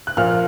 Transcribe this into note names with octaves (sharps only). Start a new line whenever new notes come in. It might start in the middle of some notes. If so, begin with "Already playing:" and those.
F#6
A#2 F3 A#3 F6